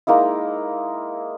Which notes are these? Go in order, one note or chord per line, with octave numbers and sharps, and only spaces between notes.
G#3 A#3 D#4 E4